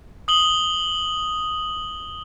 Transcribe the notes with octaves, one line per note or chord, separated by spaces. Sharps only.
D#6 F#7 G7